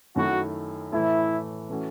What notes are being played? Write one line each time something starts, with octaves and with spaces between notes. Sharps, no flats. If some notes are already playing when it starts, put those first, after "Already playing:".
F#2 D#3 A3 E4 F#4
A2 E3 A3 E4
E3 A3 C#4 F#4